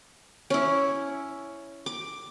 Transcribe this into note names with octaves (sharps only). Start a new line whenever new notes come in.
C#4 E4
D6